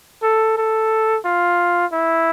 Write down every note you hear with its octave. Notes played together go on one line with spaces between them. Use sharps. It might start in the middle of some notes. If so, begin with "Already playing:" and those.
A4
A4
F4
E4